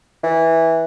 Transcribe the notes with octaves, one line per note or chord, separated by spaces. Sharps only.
E3